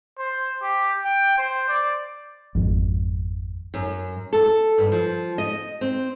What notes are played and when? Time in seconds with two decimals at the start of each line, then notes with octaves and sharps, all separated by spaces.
0.19 C5
0.62 G4
1.05 G5
1.38 C5
1.69 D5
2.55 G#1 F2
3.74 F#2
4.33 A4
4.78 G2
4.92 F3
5.38 D#5
5.81 C4